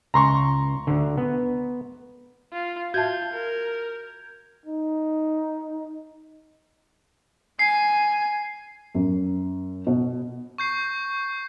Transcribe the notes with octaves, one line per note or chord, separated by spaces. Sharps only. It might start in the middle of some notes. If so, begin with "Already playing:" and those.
C#2 A#5 C6 C#6
D2 D3
B3
F4
F4 F#4 E5 A5 G6 G#6
A#4
D#4
G#5 C7
F#2
B2
C#6 G6 C7